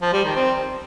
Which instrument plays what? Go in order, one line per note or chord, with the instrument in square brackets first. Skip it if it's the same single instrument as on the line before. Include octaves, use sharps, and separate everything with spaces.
[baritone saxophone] F3
G3
D#3
C4